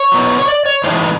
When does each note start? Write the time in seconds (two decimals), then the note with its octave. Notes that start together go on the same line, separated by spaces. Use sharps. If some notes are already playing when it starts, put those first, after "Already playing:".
Already playing: C#5
0.12 F#3 B3 E4
0.38 C#5
0.48 D5
0.66 C#5
0.84 A2 E3 G#3 C4 D#4 C5
0.96 B4